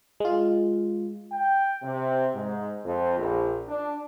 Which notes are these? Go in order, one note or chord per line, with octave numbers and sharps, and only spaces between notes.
G#3 F4
G5
C3
G#2
F2
A#1
D4